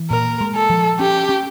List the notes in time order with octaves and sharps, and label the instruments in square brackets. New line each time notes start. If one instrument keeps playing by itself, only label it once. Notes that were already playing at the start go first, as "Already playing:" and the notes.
Already playing: [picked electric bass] E3
[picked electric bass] A#2 [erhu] A#4
[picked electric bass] G#3
[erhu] A4
[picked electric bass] F3
[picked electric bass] C#4 [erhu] G4
[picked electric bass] C#4